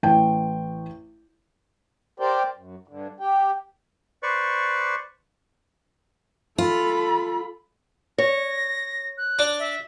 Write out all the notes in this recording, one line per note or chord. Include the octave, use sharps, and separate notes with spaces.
A1 G5
G4 A#4 C5 D5 G5
F#2
G2 D3
G4 G5
B4 C5 D5 C#6
F4 A4 B5
C#5 A#6
F#6
D4
E5